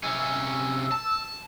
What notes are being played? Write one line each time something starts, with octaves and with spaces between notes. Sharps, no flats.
C3 C#4 E6
A5